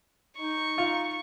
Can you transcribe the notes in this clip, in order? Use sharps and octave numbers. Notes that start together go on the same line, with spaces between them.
D#4 C#6
F4